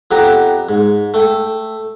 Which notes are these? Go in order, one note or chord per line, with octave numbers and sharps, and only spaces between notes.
F2 B3 G4 A#5
G#2
A3 G5